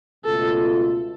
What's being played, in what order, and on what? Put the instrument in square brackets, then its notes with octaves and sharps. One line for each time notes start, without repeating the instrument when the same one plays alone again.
[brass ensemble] C#2 B2 A3 F4 [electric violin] A4